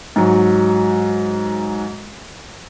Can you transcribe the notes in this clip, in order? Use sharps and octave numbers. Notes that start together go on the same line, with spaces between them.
G#2 F#3